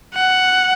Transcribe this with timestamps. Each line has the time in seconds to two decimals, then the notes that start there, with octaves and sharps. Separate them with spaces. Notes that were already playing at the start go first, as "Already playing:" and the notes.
0.14 F#5